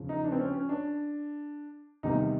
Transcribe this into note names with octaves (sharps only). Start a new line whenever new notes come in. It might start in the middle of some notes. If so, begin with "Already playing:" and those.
Already playing: E2 C#3 F3
D#4
D4
C4
C#4
C#4
D4
E2 C3 D#3 G3 D#4